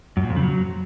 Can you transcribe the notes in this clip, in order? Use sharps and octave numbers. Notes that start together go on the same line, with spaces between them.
F#2
A#2
F2
C#3
F#3